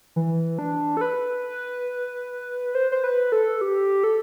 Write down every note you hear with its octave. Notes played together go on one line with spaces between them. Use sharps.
E3
D4
A4
B4
C5
C5
B4
A4
G4
A4